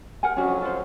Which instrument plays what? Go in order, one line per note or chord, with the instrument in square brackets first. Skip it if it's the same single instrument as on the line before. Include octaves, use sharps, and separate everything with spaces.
[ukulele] A#4 F#5 G#5
[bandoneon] F2 F#3 [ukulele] C#4 D4 F#4
[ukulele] F4 C5